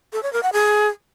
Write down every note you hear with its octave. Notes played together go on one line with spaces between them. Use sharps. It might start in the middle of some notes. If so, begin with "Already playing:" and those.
A4
C#5
A#4
F#5
G#4